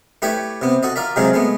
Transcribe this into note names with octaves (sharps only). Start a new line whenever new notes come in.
A3 E4 G4 B4 C#5 D5
C3 B3
F#4 A4 D#5
F4 A#4 D5 E5
C3 D#3 F#3 G#3 F4 G#4
G#3 A3 B3